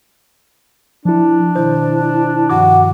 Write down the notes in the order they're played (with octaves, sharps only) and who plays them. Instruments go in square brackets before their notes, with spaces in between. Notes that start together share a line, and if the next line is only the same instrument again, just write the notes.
[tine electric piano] F3 E4 [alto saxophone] D4
[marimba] B2 D#3 [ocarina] E4 [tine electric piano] C5
[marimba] G2 D#3 F3 [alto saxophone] F#4 [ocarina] F#5 [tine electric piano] D6